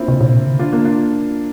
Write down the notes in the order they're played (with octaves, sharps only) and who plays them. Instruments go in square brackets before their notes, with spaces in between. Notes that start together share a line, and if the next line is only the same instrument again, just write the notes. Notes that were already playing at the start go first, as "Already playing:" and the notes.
Already playing: [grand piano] A#3 C4 D4 E4 F4
[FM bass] C3
A#2
C3
D3
[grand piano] D4 F4
A#3 D4
D4 F4